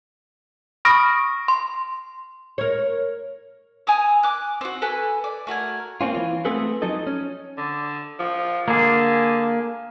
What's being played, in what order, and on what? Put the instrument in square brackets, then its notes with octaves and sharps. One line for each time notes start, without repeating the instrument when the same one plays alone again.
[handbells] B5 C#6 D#6 F6 A#6 D7
C6
[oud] A#4 C#5
[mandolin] G#5 A#5 D#6 E6
D6 F#6
C4 F#4
A4 B4 G#5 F#6
D5
A3 F#4 A#4 G#5
[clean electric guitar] A#3 C4 C#4 F4
E3 F4
A3 B3 C4 G#4 A4 B4
F3 F#3 D#4 A4 D#5
C#4
[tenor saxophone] D3
F3
[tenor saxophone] D3 [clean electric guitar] A#3 G#4